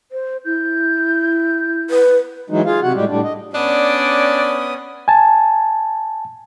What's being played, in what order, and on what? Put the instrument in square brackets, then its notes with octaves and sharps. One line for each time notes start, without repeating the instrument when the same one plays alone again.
[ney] C5
[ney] E4 [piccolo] G6
[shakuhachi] B4
[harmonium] E3 F#3 G#3 D#4
F4 G#4 F5
C3 F#4 F#5
A2 G3 G#3 G4
A2 G3 D4
D#5
[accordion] B3 D#6 [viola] C#4 [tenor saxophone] D4 [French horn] D5
[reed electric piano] G#5 A5